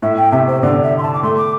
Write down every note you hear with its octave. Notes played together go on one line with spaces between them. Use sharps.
A2 E5
G5
C3 E5
C5
D3 D5
E5
C6
A5
D6
A3 C6
D6